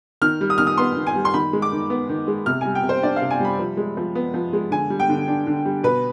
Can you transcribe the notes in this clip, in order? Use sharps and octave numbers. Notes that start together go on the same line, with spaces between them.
D#3 F6
G3
D#6
D#3 F6
D#6
B3 C6
D#3
G#5
G3
C6
D#3 B5
G#3
D6
D#3
B3
D#3
G#3
C3 F6
G3 G#5
G5
C3
C5
D4 D5
F5
C3
G#5
G3 B5
F3
G#3
F3
B3
F3
G#3
D3 G#5
G3
G5
D3
D4
D3
G3
B2 B4